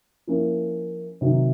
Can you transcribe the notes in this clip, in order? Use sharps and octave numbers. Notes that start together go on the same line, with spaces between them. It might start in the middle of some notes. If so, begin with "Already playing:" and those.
F3 A#3 C#4 E4
C3 D#3 F#3